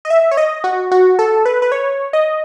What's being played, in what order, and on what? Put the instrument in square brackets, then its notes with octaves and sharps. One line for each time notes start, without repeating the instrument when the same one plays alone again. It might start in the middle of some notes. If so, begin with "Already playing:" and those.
[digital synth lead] D#5
E5
C#5
D#5
F#4
F#4
A4
B4
B4
C#5
D#5